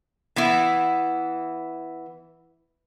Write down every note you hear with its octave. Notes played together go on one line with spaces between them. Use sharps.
E3 B3 E4